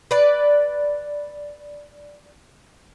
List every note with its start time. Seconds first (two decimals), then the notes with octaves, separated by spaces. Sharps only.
0.11 B4 D5